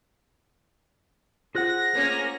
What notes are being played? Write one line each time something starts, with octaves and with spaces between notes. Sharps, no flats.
F4 G#4 C5 F#5 F#6 A#6
A3 A#3 C#4